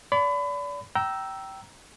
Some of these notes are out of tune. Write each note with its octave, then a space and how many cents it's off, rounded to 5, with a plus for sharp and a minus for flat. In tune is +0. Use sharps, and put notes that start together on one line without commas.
D5 -35 B5 +30
G5 -20 A#5 +10 E6 +0